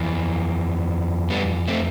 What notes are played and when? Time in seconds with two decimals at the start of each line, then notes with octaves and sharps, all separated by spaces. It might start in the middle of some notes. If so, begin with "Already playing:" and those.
Already playing: F2 E3
1.30 G3 B3
1.68 A3 C4